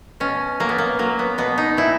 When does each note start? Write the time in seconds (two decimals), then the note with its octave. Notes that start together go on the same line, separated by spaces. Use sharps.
0.20 B2 C#4
0.60 F#3 A#3
0.69 B3
0.78 A#3
0.99 F#3 A#3
1.19 B3
1.38 B2 B3
1.58 D#4
1.77 A#2 E4